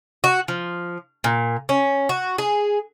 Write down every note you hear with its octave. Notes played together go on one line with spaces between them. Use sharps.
F#4
F3
A#2
C#4
F#4
G#4